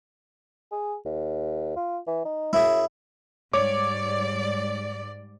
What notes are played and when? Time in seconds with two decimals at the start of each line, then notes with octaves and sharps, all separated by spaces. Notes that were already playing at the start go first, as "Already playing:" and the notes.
0.72 G#4
1.05 D#2
1.76 F4
2.07 E3
2.25 D#4
2.53 F#2 E4 G#4
3.53 G#2 G3 C#5 D5 D6